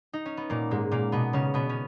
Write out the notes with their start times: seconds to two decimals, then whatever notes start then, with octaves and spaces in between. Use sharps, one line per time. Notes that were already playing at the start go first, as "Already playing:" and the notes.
0.13 D#4
0.25 C#4
0.37 B3
0.50 A#2 A#3
0.71 G#2 G#3
0.91 A#2 A#3
1.12 B2 B3
1.33 C#3 C#4
1.54 B2 B3
1.69 C#4